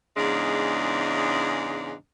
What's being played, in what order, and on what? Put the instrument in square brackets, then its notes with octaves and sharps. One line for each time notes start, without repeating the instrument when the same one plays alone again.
[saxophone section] E2 G#2 C#3 G#3 D4